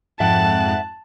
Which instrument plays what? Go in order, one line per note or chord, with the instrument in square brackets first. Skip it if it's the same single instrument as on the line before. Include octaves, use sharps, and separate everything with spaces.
[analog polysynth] F2 G#2 F#6 [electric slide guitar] E5 F#5 G5 [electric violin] A5